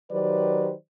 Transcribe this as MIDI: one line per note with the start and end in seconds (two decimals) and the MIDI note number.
0.11 0.73 51
0.11 0.73 54
0.11 0.73 67
0.11 0.73 71
0.11 0.73 72
0.11 0.73 74